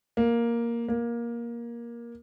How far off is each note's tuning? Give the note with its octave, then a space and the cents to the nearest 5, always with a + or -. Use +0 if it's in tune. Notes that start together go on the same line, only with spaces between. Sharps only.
A#3 +5
A#3 +15